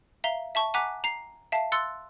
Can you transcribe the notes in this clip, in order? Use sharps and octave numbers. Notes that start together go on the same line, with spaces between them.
E5 F5 A#5 G7
E5 A5 C#6
F#5 G#5 A#5 D6 F#6 B6
A#5 C7
E5 F5 A5
C6 E6 F#6 A6 C#7